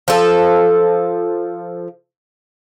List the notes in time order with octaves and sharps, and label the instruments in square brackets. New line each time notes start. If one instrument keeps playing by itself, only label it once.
[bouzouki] F3 A4